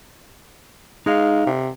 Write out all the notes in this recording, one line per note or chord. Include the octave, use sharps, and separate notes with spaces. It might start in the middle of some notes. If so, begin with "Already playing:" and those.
G#3 D#4 F5
C3